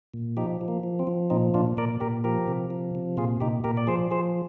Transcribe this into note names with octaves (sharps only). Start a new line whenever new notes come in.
A#2
F3 D#4 G4
F3
A#3
F3
C4
F3
A#2 C4 D#4
A#2 D4 F4
A#2 A#4 D5
A#2 G4 A#4
F3 G4 A#4
C3
F3
C3
A#2 F4 G#4
A#2 D#4 G4
A#2 G4 A#4
D5
F3 G#4 C5
F3 G#4 C5